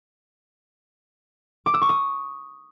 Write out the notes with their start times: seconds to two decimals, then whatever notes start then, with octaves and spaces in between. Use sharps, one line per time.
1.66 D6
1.74 E6
1.81 C#6
1.89 D#6